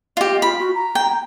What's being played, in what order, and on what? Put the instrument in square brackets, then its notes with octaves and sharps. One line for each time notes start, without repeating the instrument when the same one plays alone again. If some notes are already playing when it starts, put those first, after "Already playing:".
[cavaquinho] F4 G4 [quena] D#5
[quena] F4 [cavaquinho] B5
[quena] F#4
A#5
[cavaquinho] G5